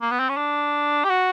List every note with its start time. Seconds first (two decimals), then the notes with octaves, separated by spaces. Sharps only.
0.02 A#3
0.11 B3
0.20 C4
0.29 C#4
0.37 D4
1.04 G4
1.09 F#4